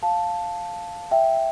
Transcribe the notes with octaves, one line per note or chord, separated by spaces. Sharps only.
F5 A5
E5 G5